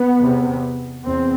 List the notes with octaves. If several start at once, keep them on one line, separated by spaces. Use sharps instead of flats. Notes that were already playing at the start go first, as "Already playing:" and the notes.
Already playing: B3
E2 C3
E2 C4